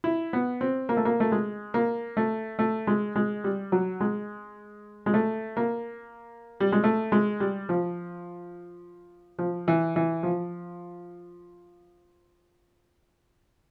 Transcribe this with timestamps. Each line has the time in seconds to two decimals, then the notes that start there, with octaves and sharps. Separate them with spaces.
0.04 E4
0.33 B3
0.61 C4
0.89 A#3
0.97 A3
1.05 A#3
1.20 A3
1.32 G#3
1.74 A#3
2.17 A3
2.59 A3
2.87 G#3
3.16 G#3
3.44 G3
3.72 F#3
4.01 G#3
5.06 G#3
5.14 A3
5.57 A#3
6.60 G3
6.72 G#3
6.84 A3
7.12 G#3
7.40 G3
7.69 F3
9.39 F3
9.68 E3
9.96 E3
10.23 F3